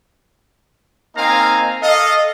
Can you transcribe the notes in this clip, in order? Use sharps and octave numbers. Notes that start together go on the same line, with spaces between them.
A#3 C4 D#4 F5 G#5 A#5
A4 D#5 F5